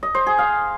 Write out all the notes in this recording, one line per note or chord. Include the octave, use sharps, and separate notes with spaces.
D#5
C5
G#4
F5